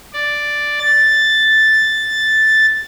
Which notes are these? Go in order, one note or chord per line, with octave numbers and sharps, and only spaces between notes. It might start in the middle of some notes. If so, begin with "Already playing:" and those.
D5
A6